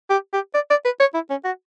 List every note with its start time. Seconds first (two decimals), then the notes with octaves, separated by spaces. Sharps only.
0.10 G4
0.33 G4
0.54 D5
0.70 D5
0.85 B4
1.00 C#5
1.14 E4
1.30 C#4
1.44 F#4